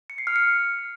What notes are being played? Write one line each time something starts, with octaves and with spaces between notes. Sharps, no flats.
C#7
C7
F6
C#7